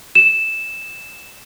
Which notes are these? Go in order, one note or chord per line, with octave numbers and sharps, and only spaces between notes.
E7